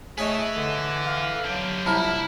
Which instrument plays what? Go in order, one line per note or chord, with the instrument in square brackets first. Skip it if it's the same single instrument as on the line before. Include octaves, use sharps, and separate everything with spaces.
[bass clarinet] A3 [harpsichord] G#4 C#5 D#5 [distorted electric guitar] B4 E5
[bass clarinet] D3
[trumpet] F5
[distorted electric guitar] D3 G4 [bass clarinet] F#3
[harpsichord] C2 F3 A#3 [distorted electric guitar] E4 [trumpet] B5